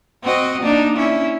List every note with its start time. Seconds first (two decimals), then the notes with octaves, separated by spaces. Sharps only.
0.23 C4 F#4 D#5
0.62 A#3 D4 D#4
0.96 C#4 E4